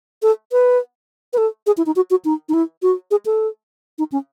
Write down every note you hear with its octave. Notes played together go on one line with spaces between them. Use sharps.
A4
B4
B4
A4
G#4
E4
D#4
F#4
F#4
D#4
D#4
E4
F#4
G#4
A4
D#4
C#4